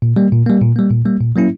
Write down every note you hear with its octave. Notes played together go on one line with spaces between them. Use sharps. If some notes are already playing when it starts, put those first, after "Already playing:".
A#2
G3 A#3
A#2
G3 A#3
A#2
G3 A#3
A#2
G3 A#3
A#2
F#3 A#3 C#4 E4